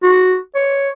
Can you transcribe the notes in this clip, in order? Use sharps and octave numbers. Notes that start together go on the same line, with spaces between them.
F#4
C#5